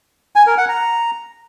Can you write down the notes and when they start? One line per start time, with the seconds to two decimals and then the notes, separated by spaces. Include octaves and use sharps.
0.36 G#5
0.47 A#4
0.58 F#5
0.69 A#5